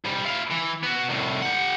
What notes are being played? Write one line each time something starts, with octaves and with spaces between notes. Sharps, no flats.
G#2 G3
E4 F4
E3
B3 F#4
C2 A2
G4 F#5